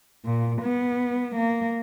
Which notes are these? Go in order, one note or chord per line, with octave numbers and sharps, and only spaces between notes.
A#2
B3
A#3